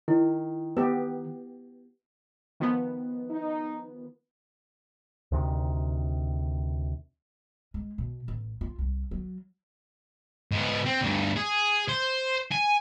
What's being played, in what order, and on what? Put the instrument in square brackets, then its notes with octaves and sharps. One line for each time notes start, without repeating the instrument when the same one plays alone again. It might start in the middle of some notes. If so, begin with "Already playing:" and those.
[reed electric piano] D#3 [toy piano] E4
[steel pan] B3 G4 [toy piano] B4
[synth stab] D#3 F3 B3
[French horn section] D#4
[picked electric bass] D2 C3 D#3
[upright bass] G#3
B2
A1
F4
C2
F#3
[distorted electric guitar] G#2 B3
C4
D2 G2
G#4
C5
G#5